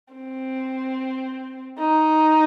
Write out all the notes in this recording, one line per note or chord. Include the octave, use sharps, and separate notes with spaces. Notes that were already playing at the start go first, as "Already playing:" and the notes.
C4
D#4